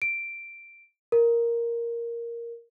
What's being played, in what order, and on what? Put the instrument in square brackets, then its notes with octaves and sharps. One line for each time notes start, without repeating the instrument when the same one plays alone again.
[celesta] D7
A#4